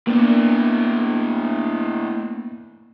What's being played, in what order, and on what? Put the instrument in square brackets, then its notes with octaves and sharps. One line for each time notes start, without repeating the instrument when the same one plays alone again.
[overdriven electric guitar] A2 D4 [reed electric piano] A#3 B3